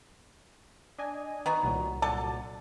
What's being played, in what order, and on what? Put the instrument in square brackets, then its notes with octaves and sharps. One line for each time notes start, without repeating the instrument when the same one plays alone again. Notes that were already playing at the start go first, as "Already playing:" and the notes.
[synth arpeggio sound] D4 D#5 G#5
[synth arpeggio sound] D#3 [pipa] B3 D#4 F#4
[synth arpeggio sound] C2 A#2 F#3
[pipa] D3 A4 A5